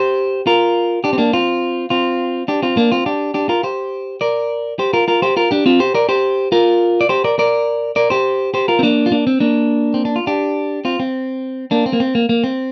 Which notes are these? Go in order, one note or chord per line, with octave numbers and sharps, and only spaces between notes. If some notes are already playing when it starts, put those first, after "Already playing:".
Already playing: G4 C5
F4 A#4
D4 G4
C4
A#3 D4
C4 F4
C4 F4
D4 G4
C4 F4
A#3 D4
C4 F4
D4 G4
D4 G4
F4 A#4
G4 C5
A#4 D5
G4 C5
F4 A#4
F4 A#4
G4 C5
F4 A#4
D4 G4
C4 F4
G4 C5
A#4 D5
G4 C5
F4 A#4
D5
G4 C5
A#4 D5
A#4 D5
A#4 D5
G4 C5
G4 C5
F4 A#4
C4
A#3 D4
F4
A#3 D4
C4
A#3 D4
C4
D4
F4
D4 G4
C4 F4
C4
A#3 D4
C4
A#3
C4
A#3
A#3
C4